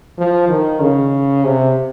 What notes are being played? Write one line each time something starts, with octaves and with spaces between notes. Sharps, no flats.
F3
D#3
C#3
C3